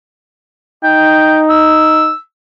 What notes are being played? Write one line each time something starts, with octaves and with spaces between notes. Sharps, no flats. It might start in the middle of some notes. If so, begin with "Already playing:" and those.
D#4 G5
E6